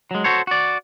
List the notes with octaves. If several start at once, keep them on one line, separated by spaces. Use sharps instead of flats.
F#3 G#3
F#4 A4 C5 C#5
F#4 D5